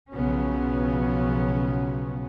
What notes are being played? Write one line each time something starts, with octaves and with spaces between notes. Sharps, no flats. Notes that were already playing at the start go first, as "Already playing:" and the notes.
B1 C#3 F3 F#3 B3 C#4